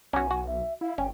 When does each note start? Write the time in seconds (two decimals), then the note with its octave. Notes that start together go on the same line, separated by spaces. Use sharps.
0.13 B1 C#4 F#4 G#5
0.31 F#4
0.47 E5
0.81 E4 F5
0.98 G1 C#4 G5